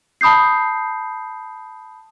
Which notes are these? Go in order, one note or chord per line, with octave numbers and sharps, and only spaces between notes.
A5 B5 D#6 G6 C7